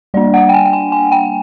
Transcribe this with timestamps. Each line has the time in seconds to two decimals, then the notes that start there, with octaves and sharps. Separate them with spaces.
0.14 G3 A#3 D4 D5
0.34 F#5
0.49 G5
0.54 G#5
0.66 G5
0.73 G#5
0.92 G#5
1.12 G5